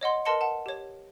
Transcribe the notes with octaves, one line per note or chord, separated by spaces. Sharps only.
C#5 D#5 F#5 C6
A#4 B4 D#5 A5 C6 C#7
F#5 A5
G4 C#5